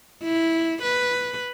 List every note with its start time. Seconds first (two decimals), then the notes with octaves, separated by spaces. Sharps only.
0.23 E4
0.83 B4